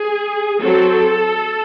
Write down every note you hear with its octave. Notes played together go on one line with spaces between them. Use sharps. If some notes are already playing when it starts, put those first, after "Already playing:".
Already playing: G#4
F#3 C4 A4